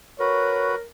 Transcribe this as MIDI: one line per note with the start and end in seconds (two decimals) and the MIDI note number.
0.20 0.75 66
0.20 0.86 70
0.20 0.75 71
0.20 0.79 73